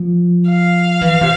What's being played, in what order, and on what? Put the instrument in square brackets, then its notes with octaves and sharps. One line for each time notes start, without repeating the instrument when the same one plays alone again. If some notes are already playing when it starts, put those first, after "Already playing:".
Already playing: [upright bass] F3
[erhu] F5
[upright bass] E3
C3